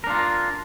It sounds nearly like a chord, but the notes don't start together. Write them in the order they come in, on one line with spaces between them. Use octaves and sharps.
A#4 D4 F4